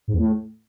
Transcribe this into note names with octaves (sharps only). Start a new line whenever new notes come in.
G#2
E2
A2